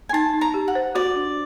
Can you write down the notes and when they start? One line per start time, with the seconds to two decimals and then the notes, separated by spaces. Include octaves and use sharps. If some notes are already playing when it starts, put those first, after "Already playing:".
0.09 G#5
0.13 D#4 A5
0.34 D#4
0.41 A#5
0.54 G4
0.68 F#5
0.75 C5
0.95 F#4 D5
1.16 D4